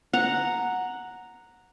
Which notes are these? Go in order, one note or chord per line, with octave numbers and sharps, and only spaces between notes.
F#5 A#5